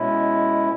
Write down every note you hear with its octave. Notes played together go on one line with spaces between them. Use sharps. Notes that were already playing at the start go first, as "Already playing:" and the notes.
Already playing: B2 G#3 C#4 E4